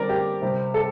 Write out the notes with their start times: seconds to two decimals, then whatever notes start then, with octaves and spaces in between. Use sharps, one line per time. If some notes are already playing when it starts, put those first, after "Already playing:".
Already playing: D3 G3 C4 A#4 D5
0.09 G4
0.42 C3 G3 C4
0.74 A4